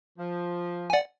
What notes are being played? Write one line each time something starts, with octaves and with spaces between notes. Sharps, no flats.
F3
G#5
D5 F#5